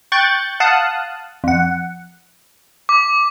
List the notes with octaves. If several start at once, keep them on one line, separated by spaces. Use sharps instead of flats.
G5 C#6 F#6 G6 A6
F5 F#5 A5 D#6 F#6
F2 F#5
D6